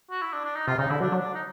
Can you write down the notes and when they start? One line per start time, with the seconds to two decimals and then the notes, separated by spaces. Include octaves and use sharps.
0.10 F#4
0.22 E4
0.33 D4
0.45 D4
0.56 D#4
0.67 C3 F4
0.78 C#3 D#4
0.90 D3 E4
1.01 F#3 D4
1.12 F#3
1.18 D4
1.35 D#4